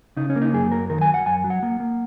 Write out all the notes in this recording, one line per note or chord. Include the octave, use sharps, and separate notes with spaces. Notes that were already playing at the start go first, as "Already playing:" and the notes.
C#3 D#4
C#4
A#3
D#4
F#2 G#4
F#3 A#4
D#3 A#4
G#5
F#2
F#5
F#2 G#5
F#3
F#5
A#3
A#3